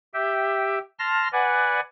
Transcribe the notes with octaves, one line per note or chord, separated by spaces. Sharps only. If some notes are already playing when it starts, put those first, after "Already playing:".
G4 E5 G5
A5 C6 F6 A#6
B4 D5 F#5 G#5